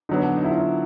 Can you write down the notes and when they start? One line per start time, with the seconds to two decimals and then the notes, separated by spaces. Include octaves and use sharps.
0.09 D3 F#3 B3 D#4
0.23 D4
0.37 D#4
0.44 E4
0.50 F4